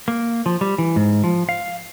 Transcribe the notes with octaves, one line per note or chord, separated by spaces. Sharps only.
A#3
F3
G3
E3
G#2
F3
F5